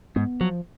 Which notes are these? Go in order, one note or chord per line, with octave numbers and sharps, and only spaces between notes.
G#2 B3
F3 F#3